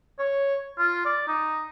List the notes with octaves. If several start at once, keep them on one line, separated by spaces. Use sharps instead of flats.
C#5
F4
D5
D#4